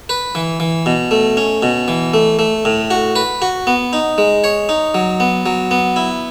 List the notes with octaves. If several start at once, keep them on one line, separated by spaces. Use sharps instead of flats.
B4
E3
E3
B2
A3
C#4
B2
E3
A3
A3
A2
F#4
B4
F#4
B3
D#4
G#3
C#5
D#4
F#3
B3
F#3
B3
E4